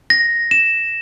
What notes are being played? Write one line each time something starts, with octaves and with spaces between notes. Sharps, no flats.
A#6
E7